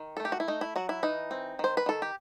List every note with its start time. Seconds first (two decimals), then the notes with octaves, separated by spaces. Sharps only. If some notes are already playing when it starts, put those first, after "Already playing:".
Already playing: D#3
0.17 A4
0.20 A3
0.25 G4
0.32 F#4
0.40 E4
0.48 A3 D#4
0.61 E4
0.76 F#3 F#4
0.89 E4
1.03 E3 D#4
1.31 C4
1.59 D#3 C5
1.77 B4
1.86 D#3 A4
2.02 G4